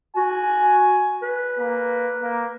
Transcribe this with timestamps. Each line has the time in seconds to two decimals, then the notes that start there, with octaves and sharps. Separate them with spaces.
0.16 F#4 G#5
1.22 B4
1.59 A#3
2.22 A#3